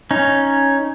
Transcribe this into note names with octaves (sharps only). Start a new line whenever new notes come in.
C#4 D#4